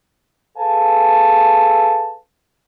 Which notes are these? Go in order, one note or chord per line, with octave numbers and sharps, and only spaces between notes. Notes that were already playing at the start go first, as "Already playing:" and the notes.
G#4 A4 B4 F5 G#5 A5